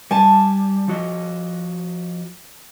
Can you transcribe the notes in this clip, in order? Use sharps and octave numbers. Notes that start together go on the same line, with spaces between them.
G3 G#5 A5
F3 F#4 D#5